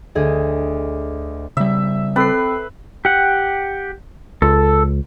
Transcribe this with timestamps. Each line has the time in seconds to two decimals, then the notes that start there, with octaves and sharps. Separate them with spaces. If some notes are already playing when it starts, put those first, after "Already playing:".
0.15 D2 G#4 D#5
1.57 C#3 G3 E5
2.16 C4 A4 B4 C7
3.05 G4 F#5
4.42 C#2 A4